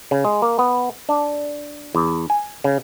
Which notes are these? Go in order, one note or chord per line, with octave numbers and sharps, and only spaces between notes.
C#3
G#3
A#3
B3
D4
E2
G#5
C#3